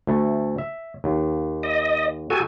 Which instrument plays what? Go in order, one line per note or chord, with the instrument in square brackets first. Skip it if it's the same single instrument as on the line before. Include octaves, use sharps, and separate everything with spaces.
[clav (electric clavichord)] D2 A3
E5
D#2
[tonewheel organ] D#5
[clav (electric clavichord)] F#4 G4 [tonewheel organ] A4 G#5